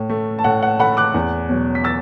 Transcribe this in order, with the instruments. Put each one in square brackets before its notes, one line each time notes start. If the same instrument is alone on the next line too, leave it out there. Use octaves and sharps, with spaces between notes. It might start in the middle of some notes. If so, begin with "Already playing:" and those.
Already playing: [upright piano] A2
A3
A5
A2 F#5
F#5
A3 F#5 B5
D6 F#6
E2
B2 F#3
B6
E6 A6